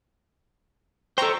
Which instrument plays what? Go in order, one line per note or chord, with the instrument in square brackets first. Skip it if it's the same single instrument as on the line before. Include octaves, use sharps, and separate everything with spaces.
[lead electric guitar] A4 C5 [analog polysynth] G5 A#5 C#6